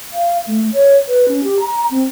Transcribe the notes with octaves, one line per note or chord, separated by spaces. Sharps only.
F5
A3
C#5
B4
C#4
G4
A#5
C4